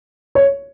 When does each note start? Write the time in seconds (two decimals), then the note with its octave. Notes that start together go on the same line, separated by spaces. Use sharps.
0.35 C#5